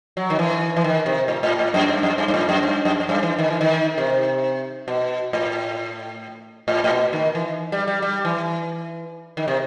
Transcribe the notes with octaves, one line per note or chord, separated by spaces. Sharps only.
F#3
D#3
E3
E3
D#3
C3
A2
A2
A2
F#2
G2
F#2
G2
G2
A2
F#2
G2
F#2
F#2
G2
E3
D#3
E3
D#3
C3
B2
A2
A2
A2
B2
D#3
E3
G3
G3
G3
E3
D#3
C3